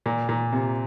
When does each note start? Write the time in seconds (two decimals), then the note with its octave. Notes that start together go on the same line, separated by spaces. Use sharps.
0.06 A#2
0.29 A#2
0.53 C3